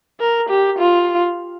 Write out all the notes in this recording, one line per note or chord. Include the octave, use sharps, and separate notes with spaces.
A#4
G4
F4